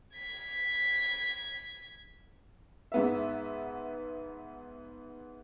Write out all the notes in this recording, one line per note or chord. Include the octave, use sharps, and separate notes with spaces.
G#6 B6
G#2 B3 E5